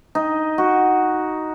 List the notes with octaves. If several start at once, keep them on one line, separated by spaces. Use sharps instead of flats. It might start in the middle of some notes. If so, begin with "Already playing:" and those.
D#4
F#4